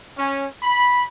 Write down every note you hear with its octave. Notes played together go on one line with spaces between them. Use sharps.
C#4
B5